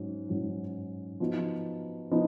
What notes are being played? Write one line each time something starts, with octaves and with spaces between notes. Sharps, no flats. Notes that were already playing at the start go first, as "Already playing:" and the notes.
Already playing: G#2 F#3 C#4
G#2 F#3 C#4
F3 B3 D#4 F#4
F3 B3 D#4